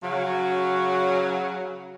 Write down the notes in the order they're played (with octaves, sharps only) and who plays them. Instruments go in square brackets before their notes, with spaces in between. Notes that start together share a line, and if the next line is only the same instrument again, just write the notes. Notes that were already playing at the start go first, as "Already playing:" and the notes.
[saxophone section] C#3 F#3